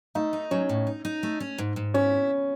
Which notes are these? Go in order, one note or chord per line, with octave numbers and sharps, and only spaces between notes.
A3 D#4
D#4
F#3 C#4
A2
D#4
D#4
A3
C#4
G#2
G#2
C#4 E4